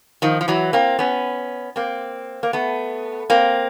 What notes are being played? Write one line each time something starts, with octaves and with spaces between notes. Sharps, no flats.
D#3 F3
F3
E3 F#3
A#3 C4
B3 C#4
A#3 C4
A#3
A3 B3
A#3 C4